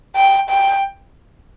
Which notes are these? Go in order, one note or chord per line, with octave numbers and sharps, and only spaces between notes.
G5
G5